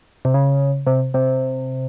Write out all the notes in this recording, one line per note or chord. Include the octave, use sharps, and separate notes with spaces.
C3
C#3
C3
C3